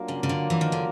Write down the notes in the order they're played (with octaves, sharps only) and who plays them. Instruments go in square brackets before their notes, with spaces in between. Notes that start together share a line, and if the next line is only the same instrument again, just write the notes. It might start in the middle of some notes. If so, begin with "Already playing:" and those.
Already playing: [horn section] F#3 A#3 D4 F4
[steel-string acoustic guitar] C#3
C#3
D3
E3
D#3
D3